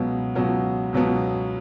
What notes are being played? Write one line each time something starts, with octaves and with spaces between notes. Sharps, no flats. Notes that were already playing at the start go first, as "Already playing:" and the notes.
Already playing: C#2 B2 F#3 B3
C#2 B2 F#3 B3
C#2 B2 F#3 B3